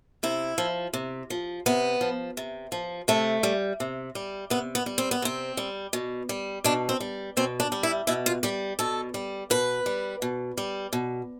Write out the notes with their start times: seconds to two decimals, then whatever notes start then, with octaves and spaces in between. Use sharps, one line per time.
0.23 C3 E4
0.58 F3
0.93 C3
1.30 F3
1.66 C3 B3
2.01 F3
2.37 C3
2.72 F3
3.08 C3 A3
3.43 G3
3.80 C3
4.15 G3
4.50 C3 B3
4.75 B3
4.86 G3
4.98 C4
5.11 B3
5.22 C3 C4
5.57 G3
5.93 B2
6.29 G3
6.64 B2 D4
6.89 C4
7.00 G3
7.37 B2 C4
7.60 D4
7.72 G3
7.83 E4
8.07 B2 E4
8.26 F4
8.43 G3 G4
8.79 B2 A4
9.14 G3
9.50 B2 B4
9.86 G3
10.22 B2
10.57 G3
10.93 B2